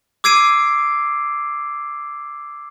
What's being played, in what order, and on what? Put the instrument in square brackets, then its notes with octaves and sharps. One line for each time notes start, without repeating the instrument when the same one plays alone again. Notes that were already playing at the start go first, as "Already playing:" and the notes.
[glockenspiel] D6 E6 G#6 C7 D7 D#7